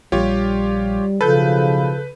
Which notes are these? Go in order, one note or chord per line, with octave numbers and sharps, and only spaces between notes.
A#1 G3 F4 G4 C#5
B1 C#3 F3 A4 B4 G6